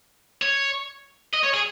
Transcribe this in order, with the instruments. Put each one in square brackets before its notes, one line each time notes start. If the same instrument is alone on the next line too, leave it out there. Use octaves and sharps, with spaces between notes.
[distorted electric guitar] C#5
D#5
C#5
G#4